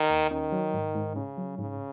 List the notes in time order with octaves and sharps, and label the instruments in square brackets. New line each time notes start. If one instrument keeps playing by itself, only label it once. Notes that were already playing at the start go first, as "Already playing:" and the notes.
Already playing: [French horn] D#3
[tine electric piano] D#2
[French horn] D#3 [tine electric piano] C#4
[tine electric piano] F#3
G#2
G#2
[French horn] C#3 [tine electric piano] C#4
[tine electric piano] F#3
[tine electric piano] G#2 [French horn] C#3